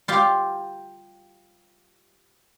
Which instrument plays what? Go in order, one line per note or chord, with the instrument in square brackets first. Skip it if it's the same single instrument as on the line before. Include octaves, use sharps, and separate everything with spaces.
[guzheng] F4 G4 F5